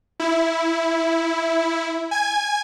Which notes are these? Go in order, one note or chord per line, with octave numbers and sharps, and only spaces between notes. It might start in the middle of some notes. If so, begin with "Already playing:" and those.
E4
G#5 G#6